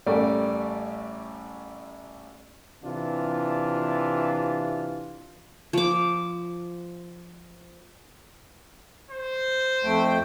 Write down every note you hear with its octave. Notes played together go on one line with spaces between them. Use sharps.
A1 G3 A3 A#4 D5
C3 E3 D4 F4
F3 D6
C5
F2 A3 G5